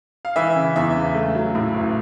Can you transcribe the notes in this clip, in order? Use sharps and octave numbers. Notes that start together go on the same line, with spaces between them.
F5
E3 E5
C#3
E2 E5
C#3
A3
F#3
A2
A1